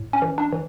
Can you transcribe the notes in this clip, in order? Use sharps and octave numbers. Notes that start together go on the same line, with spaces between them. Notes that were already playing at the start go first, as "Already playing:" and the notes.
Already playing: A2
C#4
E3
D4
E3